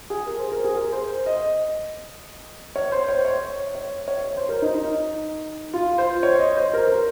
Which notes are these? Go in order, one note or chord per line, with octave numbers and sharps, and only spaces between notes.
G#4
A#4
C5
A#4
G#4
A#4
C5
D#5
C#5
C5
C#5
C#5
C#5
C#5
C#5
C5
A#4
D#4
D#4
F4
C5
C#5
D#5
C5
A#4
A#4